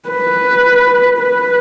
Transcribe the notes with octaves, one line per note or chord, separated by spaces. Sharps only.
B4
B4